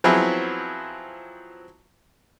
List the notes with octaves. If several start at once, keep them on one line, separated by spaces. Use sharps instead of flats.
F3 F#3 B3 C4 E4 G#4